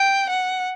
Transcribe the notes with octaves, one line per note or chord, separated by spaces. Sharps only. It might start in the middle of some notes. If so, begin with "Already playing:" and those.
Already playing: G5
F#5